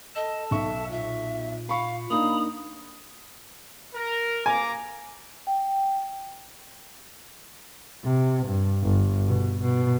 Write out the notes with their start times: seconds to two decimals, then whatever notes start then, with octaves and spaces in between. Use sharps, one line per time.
0.15 A4 D#5 A5
0.51 B1 E5 C#6
0.91 A#2 E5
1.69 F5 B5 C#6
2.10 A#3 D4 D#4 A#5 B5 D#6
3.95 A#4
4.46 A#3 G#5 A#5 D6
5.47 G5
8.04 C3
8.47 G2
8.83 G1
9.28 B2
9.62 B2